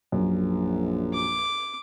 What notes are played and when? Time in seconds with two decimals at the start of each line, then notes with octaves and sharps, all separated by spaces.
0.12 A#1 F#2
1.13 D6